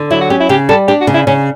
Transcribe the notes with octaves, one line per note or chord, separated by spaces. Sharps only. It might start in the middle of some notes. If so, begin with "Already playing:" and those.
Already playing: D3
F#3 E4
F#4
C#4 G4
E4
C#3 G4
G3 A4
D4 G4
F#4
C#3
E4
C#3 C#4